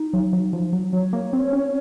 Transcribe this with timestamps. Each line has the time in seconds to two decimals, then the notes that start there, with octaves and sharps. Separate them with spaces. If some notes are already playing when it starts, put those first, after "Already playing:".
Already playing: D#4
0.13 F#3
0.33 F#3
0.53 F3
0.73 F#3
0.93 F#3 C#5
1.13 A#3
1.33 C4
1.53 C#4